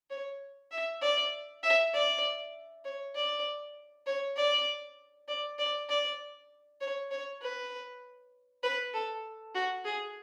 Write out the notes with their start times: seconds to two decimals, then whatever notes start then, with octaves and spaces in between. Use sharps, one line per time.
0.10 C#5
0.71 E5
1.02 D5
1.63 E5
1.94 D5
2.85 C#5
3.15 D5
4.06 C#5
4.37 D5
5.28 D5
5.59 D5
5.89 D5
6.81 C#5
7.11 C#5
7.41 B4
8.63 B4
8.94 A4
9.54 F#4
9.85 G#4